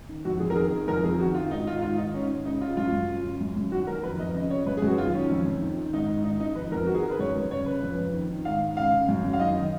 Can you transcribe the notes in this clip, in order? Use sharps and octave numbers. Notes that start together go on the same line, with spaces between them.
D#3
F2 F#4
F2 G#4
A#4
D#3 G#4
D#3
F2 A#4
F2 G#4
D#3 F#4
D#3 F4
G#2 D#4
G#2 F4
D#3 F4
D#3 D#4
G#2 C#4
G#2
C#3 D#4
C#3 F4
F#2 F4
F#2
C#3
C#3
F#2
F#2
D#3 F#4
D#3 A#4
F2 B4
F2 D#5
C#3 D#5
C#3 C#5
F#2 B4
G#4
F#2 F#4
D#3 F4
D#3 C#4
F2
F2
D#3
D#3
G#2 D#4
G#2
D#3 D#4
D#3 D#4
F2 B4
F2 A#4
D#3 F#4
G#4
D#3 A#4
B4
F#2 C#5
F#2
C#3 C#5
C#3 B4
F2
F2
D#3
D#3
G#2 F5
G#2
C#3 F5
C#3
F#2
F#2
F5
D#3 D#5
D#3